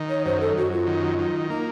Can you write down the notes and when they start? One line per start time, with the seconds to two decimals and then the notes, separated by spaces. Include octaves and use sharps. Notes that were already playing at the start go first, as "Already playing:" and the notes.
Already playing: D#3
0.09 C#5
0.25 F#2 C5
0.40 A4
0.57 F#2 F#4
0.72 F4
0.87 D#3
1.19 D#3
1.50 A#3 D#4